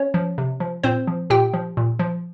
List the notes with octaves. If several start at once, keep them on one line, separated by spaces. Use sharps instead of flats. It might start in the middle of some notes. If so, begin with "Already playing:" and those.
Already playing: C#4 C#5
F3
C3
F3
A#2 C4 C5
F3
A#2 G4 G5
F3
A#2
F3